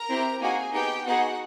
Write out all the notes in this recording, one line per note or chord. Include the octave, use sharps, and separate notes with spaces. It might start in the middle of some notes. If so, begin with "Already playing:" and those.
Already playing: A#4 A#5
C4 E4 G4
A#3 D#4 F#4 G#4 G#5
B3 D#4 G4 G#4 G5
B3 D#4 F#4 G#4 F#5